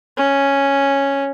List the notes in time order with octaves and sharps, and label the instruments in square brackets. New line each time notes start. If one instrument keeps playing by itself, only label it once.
[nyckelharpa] C#4